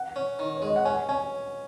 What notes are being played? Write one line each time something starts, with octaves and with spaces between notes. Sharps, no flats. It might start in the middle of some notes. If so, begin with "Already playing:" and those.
Already playing: F#5
C#4
D#3
C#5
G#3 D#5
F#5
C#4 G#5
C#4 G#5